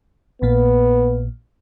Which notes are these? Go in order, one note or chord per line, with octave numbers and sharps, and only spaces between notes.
A#1 A#2 A#3 B3